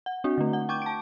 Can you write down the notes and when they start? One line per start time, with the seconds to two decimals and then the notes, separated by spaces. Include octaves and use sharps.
0.06 F#5
0.24 C4 D4 F#4
0.38 D3 A3
0.53 F#5
0.69 G5 C#6 D6 G6
0.82 A5 D7